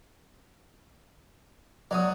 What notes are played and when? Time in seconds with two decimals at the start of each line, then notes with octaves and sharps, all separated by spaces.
1.91 F#3 D5 D#6